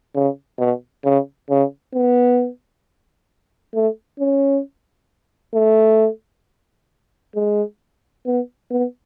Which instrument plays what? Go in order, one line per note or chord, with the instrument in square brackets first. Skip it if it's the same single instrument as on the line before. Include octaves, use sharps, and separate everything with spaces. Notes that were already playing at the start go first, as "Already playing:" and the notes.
[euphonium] C#3
B2
C#3
C#3
B3
A3
C#4
A3
G#3
B3
B3